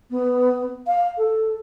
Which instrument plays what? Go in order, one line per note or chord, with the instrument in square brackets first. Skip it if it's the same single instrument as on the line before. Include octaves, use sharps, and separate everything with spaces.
[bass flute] B3
F5
A4